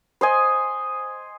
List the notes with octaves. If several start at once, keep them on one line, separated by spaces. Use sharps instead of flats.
C5 D#5 G#5